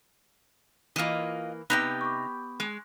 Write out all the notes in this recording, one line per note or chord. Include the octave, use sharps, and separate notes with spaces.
E3 A#3 F4 D#5
C3 B3 D#4 G4 G5 F#6
C#6 D6
G#3